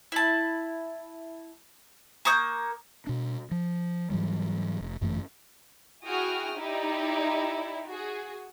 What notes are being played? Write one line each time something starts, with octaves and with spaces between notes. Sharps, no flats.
E4 A5
A#3 C#6 D#6 G6
B2 D4
F3
G#2 E3 F#3 G3
F1
G1 F#2 E3 A3
E4 F#4 G#4 G5 D#6 F6
D#4 E4 G4 D5
F#4 G#4